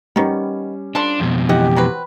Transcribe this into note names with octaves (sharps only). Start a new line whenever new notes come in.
D#3 G3 B3 C#4
F3 D4 A4 C6
F2 B2
C#3 E3 G4 D#5 F#5
F#3 C4 B4